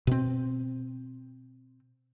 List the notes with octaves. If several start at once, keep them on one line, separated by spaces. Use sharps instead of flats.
B2 C4